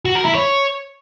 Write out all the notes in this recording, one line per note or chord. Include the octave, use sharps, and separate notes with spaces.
F#4
A#4
E4
C#5